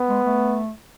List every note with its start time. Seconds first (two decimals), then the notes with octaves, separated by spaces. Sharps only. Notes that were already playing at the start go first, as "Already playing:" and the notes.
Already playing: B3
0.09 G#3
0.26 A3